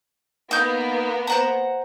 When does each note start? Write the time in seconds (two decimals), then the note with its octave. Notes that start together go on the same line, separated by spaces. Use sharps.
0.51 A#3 B3 D#4 G6
1.27 C5 F#5 A#5